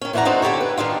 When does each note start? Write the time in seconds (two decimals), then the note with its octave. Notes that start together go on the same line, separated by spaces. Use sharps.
0.01 D#3 C#4
0.13 F2 E3 E4 D5 F#5 A#5
0.25 C4 D4 D#4 F#4 A4 C5
0.42 D3 G4 A4 C#5
0.60 B4
0.77 D#3 D4 D#4 F4